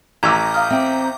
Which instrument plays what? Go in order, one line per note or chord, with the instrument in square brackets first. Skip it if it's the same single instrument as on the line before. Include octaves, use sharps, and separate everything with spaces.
[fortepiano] A1 E6 [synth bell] A#5 D6 G6 [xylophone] G#6
[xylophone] F5 D#6 F6
[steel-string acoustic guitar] C4 [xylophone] E5 G5